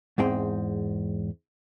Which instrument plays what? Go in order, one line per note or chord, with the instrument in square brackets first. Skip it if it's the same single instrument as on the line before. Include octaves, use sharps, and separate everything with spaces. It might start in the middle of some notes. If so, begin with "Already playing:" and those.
[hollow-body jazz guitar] E2 G#2 G#3 C4 G5